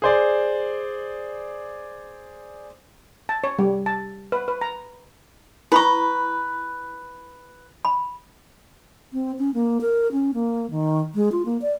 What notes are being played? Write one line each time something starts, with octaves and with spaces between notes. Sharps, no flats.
G#4 C5 D5
A5
C#5
G3
A5
B4
B4
A#5
E4 B4 A#5 B5 C#6
B5
C4
C#4
A#3
A#4
C#4
A#3
D#3
G#3
F4
A#3
D5